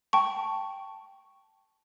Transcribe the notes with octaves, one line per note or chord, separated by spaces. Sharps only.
G5 A5 C#6